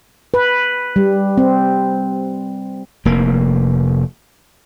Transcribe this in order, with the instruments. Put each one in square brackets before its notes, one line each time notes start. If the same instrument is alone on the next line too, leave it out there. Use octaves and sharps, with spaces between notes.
[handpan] B4
G3
C4
[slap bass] F1 A#3